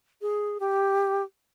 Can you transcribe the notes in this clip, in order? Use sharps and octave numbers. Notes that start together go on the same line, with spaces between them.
G#4
G4